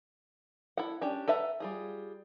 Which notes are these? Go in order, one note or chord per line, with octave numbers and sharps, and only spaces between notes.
E4 A4 F#5
C#4 D4 G4
A4 B4 E5 F#5 A#5
G3 F4 G#4